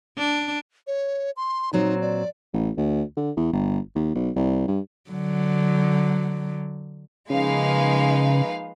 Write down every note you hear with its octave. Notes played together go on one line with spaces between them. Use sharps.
D4
C#5
C6
A#2 F#3 C4 D#4
D5
A1
D2
D3
E2
G1
D#2
B1
C2
G2
D3 F#3
C#3 F3 G#3 A#3 D#4 B4 F5